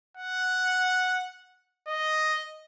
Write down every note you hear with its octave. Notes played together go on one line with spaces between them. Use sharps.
F#5
D#5